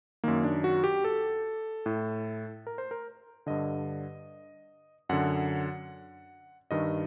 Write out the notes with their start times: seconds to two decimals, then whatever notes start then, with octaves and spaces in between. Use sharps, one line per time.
0.24 F#2 D#3 A#3
0.44 D4
0.64 F#4
0.84 G4
1.04 A4
1.86 A2
2.67 A#4
2.78 C5
2.91 A#4
3.46 G2 D3 D#5
5.09 F#2 D3 F#5
6.71 G2 D#3 D#5